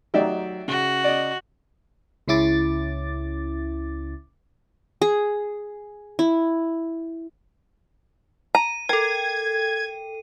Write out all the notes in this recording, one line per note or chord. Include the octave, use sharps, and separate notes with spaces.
F#3 A3 D#4 G4 D5 E5 G5
C#3 F#4
D5 D#5
C#2 C#3 C#4 E4 D6 A6
G#4
E4
A#5 D#7
A4 A#4 G5 G#6